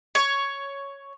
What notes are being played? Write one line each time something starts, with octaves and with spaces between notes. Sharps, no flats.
C#5